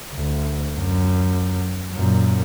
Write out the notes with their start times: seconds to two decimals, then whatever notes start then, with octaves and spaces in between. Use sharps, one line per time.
0.14 D2
0.76 F#2
1.94 F#2 A#2